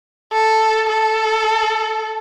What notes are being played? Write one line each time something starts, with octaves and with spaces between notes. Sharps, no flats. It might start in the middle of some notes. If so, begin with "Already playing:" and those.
A4
A4